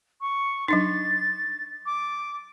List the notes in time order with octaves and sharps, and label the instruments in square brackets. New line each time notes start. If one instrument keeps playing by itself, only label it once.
[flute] C#6
[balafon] F#3 D4 D#4 [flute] A6
[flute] D6